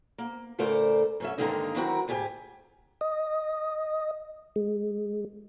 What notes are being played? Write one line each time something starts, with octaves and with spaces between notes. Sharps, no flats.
A#3
A2 C#3 A3 A#4 C5 D5
F#2 C#4 E5
G2 D3 D#3 G#3 A#3 D#4
D#3 F#3 C4 E4 F#4 A#4
D2 G#2 G4 G#5
D#5
G#3